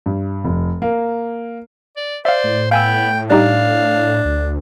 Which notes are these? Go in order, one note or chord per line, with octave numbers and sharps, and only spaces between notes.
G2
F1
A#3
D5
C5 D5 E5 F5
A2
B3 F5 G5 G#5 E6
G3 D4 D#4 G4 F5
D2